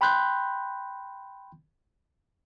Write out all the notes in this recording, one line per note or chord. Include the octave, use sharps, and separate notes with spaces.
G5 B5 C6 F#6 G6